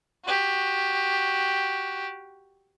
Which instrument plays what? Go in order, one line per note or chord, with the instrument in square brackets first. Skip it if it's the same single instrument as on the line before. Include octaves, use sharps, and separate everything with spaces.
[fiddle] F#4 G4